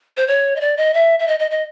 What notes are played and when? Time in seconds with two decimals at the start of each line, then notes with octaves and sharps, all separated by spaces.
0.17 C5
0.27 C#5
0.56 D#5
0.61 D5
0.77 D#5
0.94 E5
1.19 E5
1.27 D#5
1.39 D#5
1.51 D#5